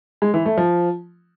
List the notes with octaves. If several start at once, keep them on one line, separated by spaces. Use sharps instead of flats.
G#3
E3
A3
F3